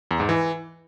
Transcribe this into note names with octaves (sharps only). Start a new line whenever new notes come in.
E2
G#2
E3